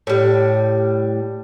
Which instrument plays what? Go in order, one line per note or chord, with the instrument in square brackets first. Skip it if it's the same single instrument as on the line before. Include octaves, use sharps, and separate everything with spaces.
[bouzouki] A2 G3